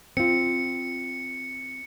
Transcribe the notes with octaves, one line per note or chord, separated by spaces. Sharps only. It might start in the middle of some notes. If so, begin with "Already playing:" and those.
C4 F4 C#7